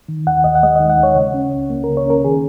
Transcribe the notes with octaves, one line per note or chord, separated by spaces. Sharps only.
D#3
D#2 F#5
D#2 D#5
F#5
G#3 D#5
D#5
D#3
F#5
D#2
C#5
C#3
C#4
C#2
A#3
A#4
C#3
C#5
C#4 A#4
D#3 G#4